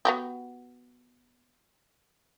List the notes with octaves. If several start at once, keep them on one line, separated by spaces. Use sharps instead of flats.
B3 F#4 G4